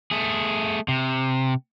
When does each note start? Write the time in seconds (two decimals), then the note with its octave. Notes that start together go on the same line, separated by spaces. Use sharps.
0.11 A3 G#4
0.88 C3